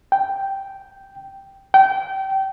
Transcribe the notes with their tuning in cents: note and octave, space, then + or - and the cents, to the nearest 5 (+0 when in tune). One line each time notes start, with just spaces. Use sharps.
G5 -5
G5 -25